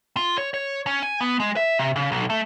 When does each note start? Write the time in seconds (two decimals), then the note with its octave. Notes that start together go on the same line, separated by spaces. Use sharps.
0.17 F4
0.38 C#5
0.54 C#5
0.87 C#4
1.03 G#5
1.21 B3
1.40 G#3
1.57 E5
1.79 C3
1.96 C#3
2.12 B1
2.30 A3